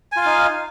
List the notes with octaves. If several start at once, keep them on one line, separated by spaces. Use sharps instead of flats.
D#4 F4 F5 G#5